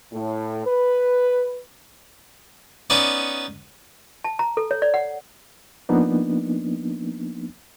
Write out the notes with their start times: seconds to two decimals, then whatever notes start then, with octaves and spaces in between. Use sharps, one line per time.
0.13 A2
0.66 B4
2.90 B3 C#4 D#4 D5
4.24 A5
4.39 A#5
4.57 A4
4.71 C#5
4.82 D5
4.94 F#5
5.89 F3 A#3 B3 D4 D#4